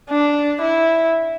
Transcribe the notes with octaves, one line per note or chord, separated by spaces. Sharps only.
D4
E4